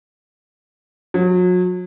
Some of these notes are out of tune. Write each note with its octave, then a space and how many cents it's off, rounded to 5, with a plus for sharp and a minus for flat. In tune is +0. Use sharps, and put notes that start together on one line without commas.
F#3 -35